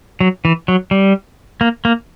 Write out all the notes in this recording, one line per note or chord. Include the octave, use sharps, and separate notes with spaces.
F#3
E3
F#3
G3
A#3
A#3